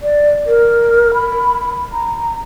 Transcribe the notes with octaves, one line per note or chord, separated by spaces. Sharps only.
D5
A#4
B5
A#5